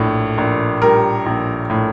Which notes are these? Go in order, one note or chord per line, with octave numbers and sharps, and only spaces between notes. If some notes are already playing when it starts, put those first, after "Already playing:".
Already playing: A#1 A2
A#1
G3 A#4
A#1
A2